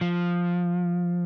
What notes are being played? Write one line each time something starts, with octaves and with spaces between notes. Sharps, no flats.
F3